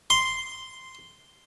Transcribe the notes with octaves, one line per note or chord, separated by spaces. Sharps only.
C6